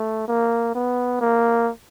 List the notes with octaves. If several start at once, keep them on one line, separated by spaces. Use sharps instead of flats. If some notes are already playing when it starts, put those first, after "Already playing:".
Already playing: A3
A#3
B3
A#3